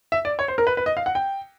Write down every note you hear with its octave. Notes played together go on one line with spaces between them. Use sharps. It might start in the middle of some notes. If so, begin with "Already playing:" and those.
E5
D5
C#5
C5
A#4
B4
B4
D#5
F5
F#5
G5